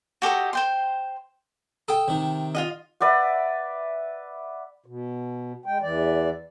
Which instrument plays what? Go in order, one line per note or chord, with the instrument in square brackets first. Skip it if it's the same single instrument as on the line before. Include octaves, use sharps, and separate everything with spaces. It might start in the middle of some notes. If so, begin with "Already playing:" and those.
[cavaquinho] F#4 G4 A4 D#5
C5 G5 C6
[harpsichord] A4 [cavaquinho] G5 D#6
[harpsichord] C3 D#3
[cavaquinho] F4 F#4 D#5
[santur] B4 D5 E5 F#5
[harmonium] B2
G#3 G5
E2 E3 D5